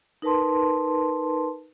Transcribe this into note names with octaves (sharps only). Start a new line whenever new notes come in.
D#4 A#4 B4 A5 C6